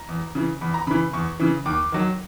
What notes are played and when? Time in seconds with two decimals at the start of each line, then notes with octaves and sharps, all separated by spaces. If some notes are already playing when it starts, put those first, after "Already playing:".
Already playing: A#5
0.09 E2
0.35 C#3 E3
0.61 E2 B5
0.74 A#5
0.87 C#3 E3 B5
1.13 E2 C#6
1.40 C#3 E3
1.66 D#2 D6
1.92 D#3 F#3